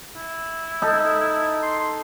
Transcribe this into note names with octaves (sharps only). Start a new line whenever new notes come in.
E4
D#4 A4
C6
C6